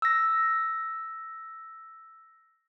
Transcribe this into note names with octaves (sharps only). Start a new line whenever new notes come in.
E6 A#6